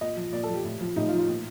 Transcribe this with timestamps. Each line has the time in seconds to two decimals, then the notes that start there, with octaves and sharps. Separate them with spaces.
0.01 A#2 D#5
0.17 F3
0.33 A#2 D5
0.43 A4
0.49 F3 G4
0.64 A2
0.81 F3
0.96 A2 D#4
1.07 F4
1.13 F3
1.18 F4
1.28 A#2